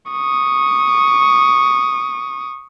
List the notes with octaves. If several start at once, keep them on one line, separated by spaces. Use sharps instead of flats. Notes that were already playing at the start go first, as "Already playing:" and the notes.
C#6 D#6